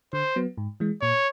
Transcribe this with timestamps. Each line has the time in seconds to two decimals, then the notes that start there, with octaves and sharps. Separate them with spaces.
0.13 D3 C5
0.36 F#3 B3
0.58 G#2
0.80 E3 G#3
1.01 A#2 C#5